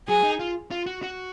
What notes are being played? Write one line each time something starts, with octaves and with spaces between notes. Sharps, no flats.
F#3 G#4
D#4
F4
F4
F#4
F#4